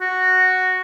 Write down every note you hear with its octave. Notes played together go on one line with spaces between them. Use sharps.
F#4